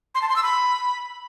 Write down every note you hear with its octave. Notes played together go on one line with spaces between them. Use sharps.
C6
A5
C6
E6
B5